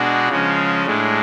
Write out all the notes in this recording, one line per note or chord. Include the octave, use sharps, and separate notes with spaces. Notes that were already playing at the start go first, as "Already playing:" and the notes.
Already playing: B2 G#3 D4 F#4
C#3 F3 G#3 C#4
A2 G#3 D4